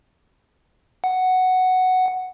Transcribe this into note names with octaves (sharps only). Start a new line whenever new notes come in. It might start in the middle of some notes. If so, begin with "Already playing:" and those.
F#5